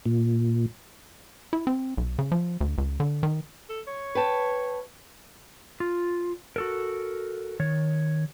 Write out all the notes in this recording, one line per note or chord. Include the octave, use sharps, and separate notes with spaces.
A#2
E4
C4
B1
C#3
F3
D2
C#2
D3
D#3
A4
C#5
B4 G5 A5
F4
F#4 A4 A#4
D#3 C#5